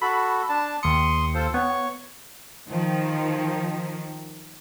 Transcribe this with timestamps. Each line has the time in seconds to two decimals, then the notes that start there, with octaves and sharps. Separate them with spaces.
0.02 F#4 A4 B5
0.49 D4 A5
0.83 D#2 C6 D#6 C#7
1.35 F4 A4 C5
1.54 B3 C#5 C#6
2.69 D#3 F3